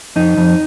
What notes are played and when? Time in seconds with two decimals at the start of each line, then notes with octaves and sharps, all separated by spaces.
0.16 F2 D#4
0.37 F2